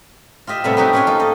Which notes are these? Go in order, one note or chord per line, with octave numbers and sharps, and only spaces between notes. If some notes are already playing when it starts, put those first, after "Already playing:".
F4 G4 D#5 E5
A2 C3 G3 B3 E4
D4 D#4 F#4 G4 A#4 B4
C#4 D#4 F4 C#5 G#5
A#3 D#4 A4
A4 D#5